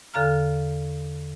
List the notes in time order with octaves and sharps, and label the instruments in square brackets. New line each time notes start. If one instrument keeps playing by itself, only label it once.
[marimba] E2 D3 A4 F5 A#5 F6